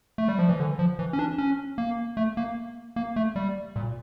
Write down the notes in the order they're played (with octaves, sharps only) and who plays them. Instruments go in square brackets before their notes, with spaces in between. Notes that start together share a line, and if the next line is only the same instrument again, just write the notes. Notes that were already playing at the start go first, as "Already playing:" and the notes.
[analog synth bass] A3
G3
F3
E3
D3
F3
E3
C#4
D4
C#4
A#3
A3
A#3
A#3
A3
G3
A#2